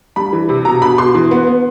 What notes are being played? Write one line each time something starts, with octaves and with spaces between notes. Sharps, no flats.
G3 B5
E3
C3
B2 A#5
B2 B5
B2 C6
E3
B3
B3